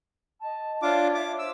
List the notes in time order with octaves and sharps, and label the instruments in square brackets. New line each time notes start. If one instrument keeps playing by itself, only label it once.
[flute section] D#5 A5
[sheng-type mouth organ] D4 F4 D6 [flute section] C#5 E5 F5
[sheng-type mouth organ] D6
[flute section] C5 E5 [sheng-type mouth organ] E6